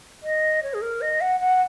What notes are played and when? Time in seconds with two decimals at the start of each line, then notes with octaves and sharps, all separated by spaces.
0.23 D#5
0.63 C#5
0.74 G#4
0.82 A#4
1.01 D#5
1.21 F#5
1.40 F#5